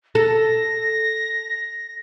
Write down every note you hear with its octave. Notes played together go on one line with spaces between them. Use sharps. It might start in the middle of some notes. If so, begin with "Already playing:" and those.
A4 A#6